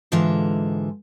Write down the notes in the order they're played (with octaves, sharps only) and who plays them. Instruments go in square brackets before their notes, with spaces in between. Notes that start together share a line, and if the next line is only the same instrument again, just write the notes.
[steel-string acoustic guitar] G#2 D3 E3 G#3 F4 E5